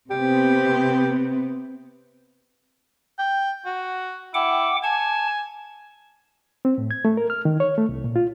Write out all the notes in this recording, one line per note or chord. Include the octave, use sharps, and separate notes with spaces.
C3 B3 C4 G4
G5
F#4
E4 F#5 G5 D6
G#5 A5
C4
A2
G#6
A3
A#4
F6
D#3
C#5
A3
C2
A#2
F4